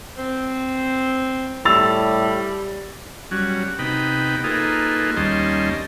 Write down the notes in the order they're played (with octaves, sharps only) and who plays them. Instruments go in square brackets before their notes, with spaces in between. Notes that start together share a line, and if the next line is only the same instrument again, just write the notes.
[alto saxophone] C4
[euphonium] A2 [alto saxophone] G3 [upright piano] E6 A6 F7
[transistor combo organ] F#3 G3 C#4 F#4
C3 B3 D#4 G5 B5
A#3 D#4 F4 G#4 A4 B4
D#2 G3 C#4 D#5 A5 C6